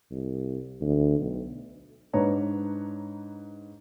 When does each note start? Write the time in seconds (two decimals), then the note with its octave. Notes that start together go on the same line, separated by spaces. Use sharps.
0.11 C2
0.81 D2
1.20 B1
2.13 G#2 D4 B4 C#5 A#5